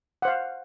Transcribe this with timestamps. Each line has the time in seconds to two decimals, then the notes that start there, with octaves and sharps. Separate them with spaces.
0.22 F#5
0.25 C5
0.28 F5